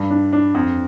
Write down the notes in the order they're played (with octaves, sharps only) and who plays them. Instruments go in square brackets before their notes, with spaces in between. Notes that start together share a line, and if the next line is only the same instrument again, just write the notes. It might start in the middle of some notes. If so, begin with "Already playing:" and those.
Already playing: [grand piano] G2
D4
D4
F2